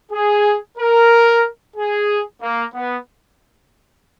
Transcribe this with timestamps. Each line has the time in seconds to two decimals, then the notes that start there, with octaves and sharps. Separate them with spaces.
0.12 G#4
0.78 A#4
1.76 G#4
2.42 A#3
2.75 B3